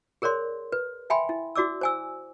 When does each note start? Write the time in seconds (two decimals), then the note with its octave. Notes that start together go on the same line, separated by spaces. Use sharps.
0.22 G#4 A#4 C#5 D5 C6
0.72 B4
1.10 E5 G5 G#5 B5 C6
1.29 E4
1.56 E4 F#4 D5 D6 E6
1.81 C5 G#5 E6